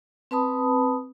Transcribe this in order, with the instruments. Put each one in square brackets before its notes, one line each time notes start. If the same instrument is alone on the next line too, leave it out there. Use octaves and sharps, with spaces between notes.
[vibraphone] C4 B4 A5 B5 D#6